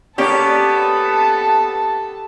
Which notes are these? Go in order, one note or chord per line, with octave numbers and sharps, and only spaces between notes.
A#3 B3 C#4 G4 A4 D5 A5